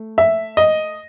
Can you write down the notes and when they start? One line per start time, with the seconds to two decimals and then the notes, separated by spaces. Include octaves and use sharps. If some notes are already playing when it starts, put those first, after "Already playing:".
Already playing: A3
0.18 E5
0.57 D#5